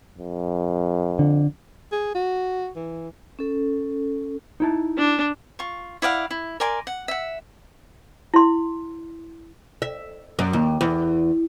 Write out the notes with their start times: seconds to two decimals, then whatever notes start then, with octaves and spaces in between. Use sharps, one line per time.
0.18 F2
1.19 D3
1.92 G#4
2.15 F#4
2.76 E3
3.39 C#4 A4
4.60 D#4 E4 A5
4.98 D4
5.59 F4 C#6
6.02 E4 D5 F5 F#5
6.31 E4
6.60 A#4 D5 G#5 C6
6.87 F#5
7.08 E5 F#5
8.34 E4 C6
9.82 E5
10.39 F#2
10.53 D#2
10.81 E2